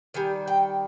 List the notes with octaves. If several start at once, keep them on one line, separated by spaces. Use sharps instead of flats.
D#3 G3 G#5
G5